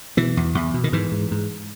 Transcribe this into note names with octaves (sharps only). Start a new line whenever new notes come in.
B2 E3
E2
E2
B2
D#3
G#2 E3
G#2
G#2